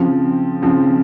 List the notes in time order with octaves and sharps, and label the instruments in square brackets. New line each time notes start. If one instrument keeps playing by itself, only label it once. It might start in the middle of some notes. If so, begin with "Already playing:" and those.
Already playing: [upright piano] C#3 F3 C4
C#3 F3 C4